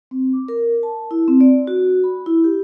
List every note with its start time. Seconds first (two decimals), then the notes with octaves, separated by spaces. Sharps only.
0.11 C4
0.33 D6
0.48 A#4
0.83 A5
1.11 E4
1.28 C4
1.41 D5
1.67 F#4
2.04 B5
2.26 E4
2.44 G4